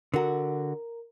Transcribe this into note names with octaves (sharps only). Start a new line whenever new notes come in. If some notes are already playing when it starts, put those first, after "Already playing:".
D3 F#4 A#4 A#5